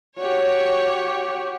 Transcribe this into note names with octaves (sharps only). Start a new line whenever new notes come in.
F#4 G4 C#5